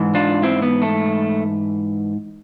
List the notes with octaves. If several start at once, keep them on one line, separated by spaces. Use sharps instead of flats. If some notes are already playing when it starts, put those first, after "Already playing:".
Already playing: G#2 E3
D4 F4
C4 E4
B3
A3